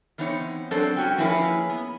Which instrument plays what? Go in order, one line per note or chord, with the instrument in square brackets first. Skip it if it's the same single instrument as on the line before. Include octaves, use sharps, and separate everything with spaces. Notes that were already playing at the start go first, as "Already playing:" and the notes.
[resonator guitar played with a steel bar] E3 B3 C4 D#4 C#5
F#3 C4 D4 F#4 A4 C5
G2 C#4 F#4 G5
F3 A#3 C#4 E4 G#4 B4
B3